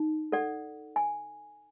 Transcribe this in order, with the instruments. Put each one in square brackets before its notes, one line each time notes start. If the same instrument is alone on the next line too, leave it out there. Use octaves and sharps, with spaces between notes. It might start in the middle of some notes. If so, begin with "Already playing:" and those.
Already playing: [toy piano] D#4
A4 D5 F#5
G#5